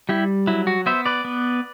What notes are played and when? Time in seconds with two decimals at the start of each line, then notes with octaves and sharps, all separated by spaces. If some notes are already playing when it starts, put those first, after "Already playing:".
0.09 G3 E4 G4
0.47 F#3 E4
0.67 F#4
0.86 B3 C5 E5
1.06 B4 D5
1.25 B3